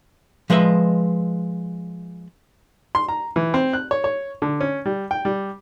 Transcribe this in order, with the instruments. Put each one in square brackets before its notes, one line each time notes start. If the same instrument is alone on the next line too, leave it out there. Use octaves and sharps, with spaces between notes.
[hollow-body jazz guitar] F3 G#3 B4 D#5 E5
[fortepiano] C6
A#5
E3
C4
F#6
C#5
C#5
D3
C#4
G3
G5
G3